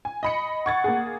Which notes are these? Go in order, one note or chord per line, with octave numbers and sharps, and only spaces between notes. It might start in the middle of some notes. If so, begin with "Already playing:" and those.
G#5
D#5 B5 C#7
F#5 C#6 G#6 A6
A#3 G#4